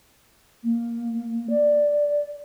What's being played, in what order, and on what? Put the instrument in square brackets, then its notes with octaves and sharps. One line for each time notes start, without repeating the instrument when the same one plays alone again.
[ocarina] A#3
D5